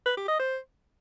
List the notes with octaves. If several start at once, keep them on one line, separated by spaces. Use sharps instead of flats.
B4
G4
D#5
C5